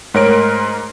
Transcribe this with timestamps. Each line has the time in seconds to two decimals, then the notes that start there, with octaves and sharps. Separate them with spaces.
0.14 G#2 A3 A#4 C#5 D7